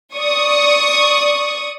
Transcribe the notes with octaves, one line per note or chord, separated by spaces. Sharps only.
D5 C#6 D#6